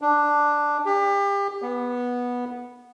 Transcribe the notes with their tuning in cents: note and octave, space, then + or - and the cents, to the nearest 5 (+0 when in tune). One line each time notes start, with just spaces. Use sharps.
D4 +5
G4 +30
B3 -10